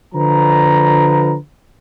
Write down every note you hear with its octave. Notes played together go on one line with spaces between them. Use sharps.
D3 F3 B4 A#5